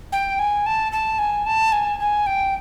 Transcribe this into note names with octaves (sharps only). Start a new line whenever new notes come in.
G5
G#5
A5
A5
G#5
A5
G#5
G#5
G5